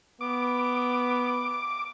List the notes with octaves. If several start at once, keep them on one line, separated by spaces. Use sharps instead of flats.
B3 D6